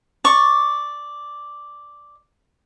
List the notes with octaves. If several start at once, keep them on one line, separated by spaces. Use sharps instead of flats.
D5 C#6